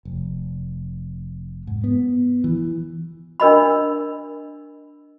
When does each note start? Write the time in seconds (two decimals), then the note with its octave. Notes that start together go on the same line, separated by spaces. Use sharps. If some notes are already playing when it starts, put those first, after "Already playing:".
0.05 F1
1.67 G#2
1.84 B3
2.44 E3
3.40 D4 A#4 D#5 B5